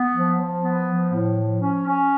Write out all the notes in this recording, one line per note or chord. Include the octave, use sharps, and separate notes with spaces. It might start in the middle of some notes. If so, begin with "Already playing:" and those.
Already playing: B3
F3
F3
B3
F3
A2
F3
C#4
C#4